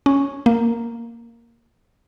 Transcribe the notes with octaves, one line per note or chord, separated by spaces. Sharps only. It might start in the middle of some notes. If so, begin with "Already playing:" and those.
C#4
A#3